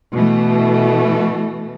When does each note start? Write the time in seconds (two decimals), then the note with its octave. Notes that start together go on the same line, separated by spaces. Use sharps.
0.13 B2 E3 A3